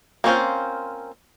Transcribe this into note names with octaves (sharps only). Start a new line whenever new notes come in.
A#3 C4 C#4 F4 C5